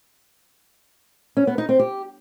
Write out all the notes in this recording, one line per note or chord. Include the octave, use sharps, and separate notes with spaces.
C#4
B3
D#4
C4
G4